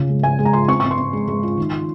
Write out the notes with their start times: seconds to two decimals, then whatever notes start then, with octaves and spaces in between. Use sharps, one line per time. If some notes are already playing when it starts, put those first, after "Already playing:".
Already playing: C#3 F4
0.09 G#3
0.23 G#3 G#5
0.39 G#3
0.45 A#5
0.53 F4 C6
0.68 C4 C#6
0.80 C4 C#6
0.91 C6
0.98 C4
1.13 G#3
1.28 G#3
1.43 F4
1.57 D#3
1.73 F4